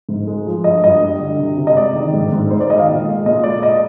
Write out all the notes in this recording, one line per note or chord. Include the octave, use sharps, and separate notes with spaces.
G#2
G#3
F3
G2 D#5
G2 D#5
G3
D3
C3
C3
D#5
G#3 D5
D#3
G#2
G#2
G#3 C5
D5
D#3 D#5
F5
A#2
G#3
A#2 D#5
G#3 D5
D#5